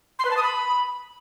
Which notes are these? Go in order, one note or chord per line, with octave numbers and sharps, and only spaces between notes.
C6
B4
A5
D#6
B5